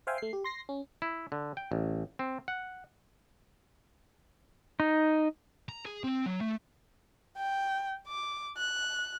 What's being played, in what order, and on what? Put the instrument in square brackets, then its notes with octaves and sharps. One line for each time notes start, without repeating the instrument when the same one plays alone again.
[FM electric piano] C5 E5 F5 G5 G#5
A3 C7
G4
C6 A#6 C7
C#4
[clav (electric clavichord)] E4
D3
G5
A1
C4
F#5
[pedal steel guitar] D#4
[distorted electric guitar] A#5
G#4
C4
F#3
A3
[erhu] G5
D6
F#6